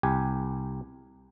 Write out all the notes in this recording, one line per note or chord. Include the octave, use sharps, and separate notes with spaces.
C2 G4 G#5